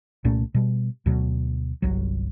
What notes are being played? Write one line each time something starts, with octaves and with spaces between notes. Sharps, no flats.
C2 A#2 A3 C#4
B2 G3
D2 B2 F#3
G1 C2 F#3